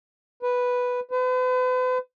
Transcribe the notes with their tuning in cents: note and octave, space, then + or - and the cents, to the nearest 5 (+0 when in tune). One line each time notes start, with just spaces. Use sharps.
B4 +0
B4 +45